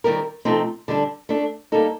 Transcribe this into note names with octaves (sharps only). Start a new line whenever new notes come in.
D#3 G3 C4 G4 A#4
C3 F3 A3 C4 D#4
D3 G3 D4 A4
A3 D4 A4
G3 A#3 D#4 A4